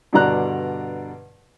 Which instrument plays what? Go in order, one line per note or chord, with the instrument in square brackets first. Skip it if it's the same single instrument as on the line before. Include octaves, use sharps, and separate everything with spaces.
[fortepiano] G2 B2 D3 D5 A#5 F#6